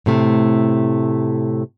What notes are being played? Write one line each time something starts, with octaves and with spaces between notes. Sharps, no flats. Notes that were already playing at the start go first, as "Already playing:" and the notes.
A2 C3 A3